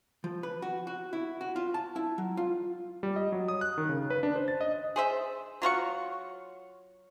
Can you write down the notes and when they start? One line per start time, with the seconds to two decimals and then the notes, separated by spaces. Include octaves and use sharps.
0.24 F3
0.43 B4
0.62 F#4
0.87 F#4
1.13 E4
1.41 F#4
1.56 F4
1.74 A5
1.96 E4
2.18 F#3
2.37 F4
3.03 G3
3.16 D#5
3.32 F#3
3.48 D#6
3.61 F#6
3.78 D#3
3.89 C#3
4.10 B4
4.23 D4
4.36 C5
4.48 A6
4.61 D#5
4.96 G#4 C5 E5
5.62 F#3 F4 F#4 C#6